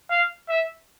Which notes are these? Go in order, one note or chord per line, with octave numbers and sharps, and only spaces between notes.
F5
E5